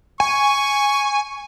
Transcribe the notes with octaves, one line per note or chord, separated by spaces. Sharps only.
G#5 C#6